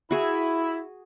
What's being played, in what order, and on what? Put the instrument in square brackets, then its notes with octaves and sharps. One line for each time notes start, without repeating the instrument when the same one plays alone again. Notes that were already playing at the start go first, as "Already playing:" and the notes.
[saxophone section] E4 [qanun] F#4 G#4